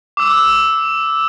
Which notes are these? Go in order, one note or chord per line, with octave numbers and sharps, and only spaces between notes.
D6 E6